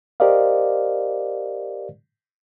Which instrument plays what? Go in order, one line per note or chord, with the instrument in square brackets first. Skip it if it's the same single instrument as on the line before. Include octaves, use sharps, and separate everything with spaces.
[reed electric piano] G4 A#4 C5 D5 D#5 F5